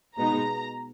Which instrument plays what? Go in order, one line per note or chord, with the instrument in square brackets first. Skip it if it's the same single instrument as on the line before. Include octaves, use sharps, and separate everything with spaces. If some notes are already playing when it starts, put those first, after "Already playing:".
[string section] B2 G#3 B3 D#4 A#5